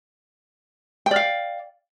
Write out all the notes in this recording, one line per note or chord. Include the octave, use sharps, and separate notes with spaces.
D5 F5 G5